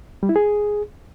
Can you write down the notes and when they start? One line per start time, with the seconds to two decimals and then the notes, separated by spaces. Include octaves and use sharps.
0.23 G3
0.29 E4
0.36 G#4